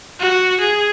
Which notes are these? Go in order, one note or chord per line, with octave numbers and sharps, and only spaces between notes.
F#4
G#4